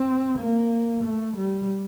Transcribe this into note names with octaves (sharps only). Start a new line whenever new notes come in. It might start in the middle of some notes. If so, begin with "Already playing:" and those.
Already playing: C4
A#3
A3
G3